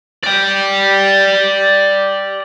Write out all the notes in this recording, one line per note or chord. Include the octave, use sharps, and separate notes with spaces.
D5 G5